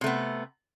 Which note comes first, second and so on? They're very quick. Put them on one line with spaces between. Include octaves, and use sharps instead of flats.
C3 A3 B3